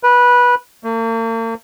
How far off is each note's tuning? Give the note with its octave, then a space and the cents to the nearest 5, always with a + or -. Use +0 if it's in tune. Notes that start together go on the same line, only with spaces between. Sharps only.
B4 -15
A#3 -45